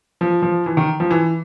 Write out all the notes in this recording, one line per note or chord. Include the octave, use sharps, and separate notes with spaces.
F3
F3
E3
D#3
F3
E3